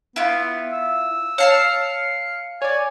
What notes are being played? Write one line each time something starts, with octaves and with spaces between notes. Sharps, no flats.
B3 E4 F4
E6
C#5 F5 A5 F6 C7 C#7
C#5 D5 G#5